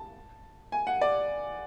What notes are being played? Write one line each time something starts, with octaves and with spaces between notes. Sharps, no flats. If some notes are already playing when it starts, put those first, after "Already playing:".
Already playing: A5
G#5
F#5
D5